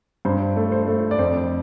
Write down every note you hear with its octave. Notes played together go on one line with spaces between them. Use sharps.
G2 C5
A3
C5
A3
D5
F2 C5